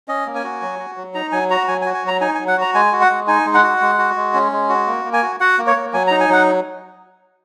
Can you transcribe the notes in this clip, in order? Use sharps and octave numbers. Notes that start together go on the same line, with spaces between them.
C#4 D#5
A#3
G#5
F#4
F#3
F#4
F#3
D#4 A#5
F#3 G#5
F#4 A#5
F#3 G#5
G#5
F#4
G#5
F#3 A#5
D#4 G#5
G#5
F#3
F#5
F#4 A#5
G#3 G#5
F#4
F#5
G#3
D#4 G#5
G#3
F#5
F#4
G#3
F#4
G#3
C#4
G#3
F#4
A#3
A#3
G#5
F#4
F#4 F#5
A#3
C#5
A#3
F#3 G#5
D#4 A#5
G#5
F#3 F#5